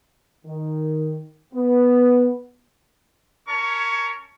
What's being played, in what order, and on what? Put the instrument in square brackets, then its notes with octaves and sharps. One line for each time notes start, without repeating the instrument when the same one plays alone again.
[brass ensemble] D#3
B3
[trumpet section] C#4 A#4 C#5 A5 C#6